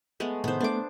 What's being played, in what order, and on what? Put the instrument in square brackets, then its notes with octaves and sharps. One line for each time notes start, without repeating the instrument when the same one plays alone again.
[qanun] G#3 A3 B3
[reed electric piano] A2 C3 D#3 [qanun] B3 C5
[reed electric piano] A3 B3 [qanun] D4 D6